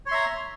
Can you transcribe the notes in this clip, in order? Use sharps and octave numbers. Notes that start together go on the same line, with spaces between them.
C#5 E5 A#5 C6